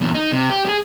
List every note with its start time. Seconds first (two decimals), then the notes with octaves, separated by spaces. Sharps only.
0.01 E2 A#2
0.14 D#4
0.32 C3
0.50 G4
0.65 G4 G#4